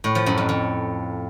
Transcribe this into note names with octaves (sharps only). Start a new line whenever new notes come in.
A2
F3
F#2
F2
F2